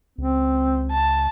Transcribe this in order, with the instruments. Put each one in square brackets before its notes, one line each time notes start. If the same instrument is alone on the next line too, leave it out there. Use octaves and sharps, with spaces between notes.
[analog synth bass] C#2 [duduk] C4
[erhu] A5